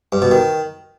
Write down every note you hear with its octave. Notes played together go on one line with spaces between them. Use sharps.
G2
B2
D#3